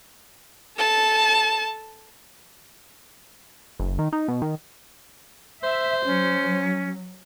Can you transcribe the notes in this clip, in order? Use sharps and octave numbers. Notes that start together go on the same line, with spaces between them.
A4 A5
F#1
D#3
D#4
B2
D#3
C5 E5
F#3 C#4